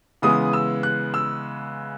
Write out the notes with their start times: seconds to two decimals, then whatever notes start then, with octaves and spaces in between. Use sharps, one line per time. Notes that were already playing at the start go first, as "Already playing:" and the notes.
0.22 C#3 E3 G#3 B3 D#6
0.53 E6
0.83 F#6
1.14 E6